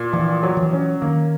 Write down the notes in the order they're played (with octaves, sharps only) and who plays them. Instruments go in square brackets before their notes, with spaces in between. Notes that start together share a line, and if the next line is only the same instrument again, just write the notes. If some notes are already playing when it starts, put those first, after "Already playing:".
Already playing: [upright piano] A#2
[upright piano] A#1 [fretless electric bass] E3
[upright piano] F#3
[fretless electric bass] E3
[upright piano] C#4
[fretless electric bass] D#3 [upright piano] A#3